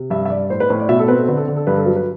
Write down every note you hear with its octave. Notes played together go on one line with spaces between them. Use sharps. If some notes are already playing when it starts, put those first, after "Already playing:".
Already playing: C3
G2 E5
E5
G2 D5
A2 C5
B4
A2 C5
D5
B2 E5
A4
C4 B4
A4
D3 B4
A4
D3
A4
G2 B4
A4
F#3 B4
B4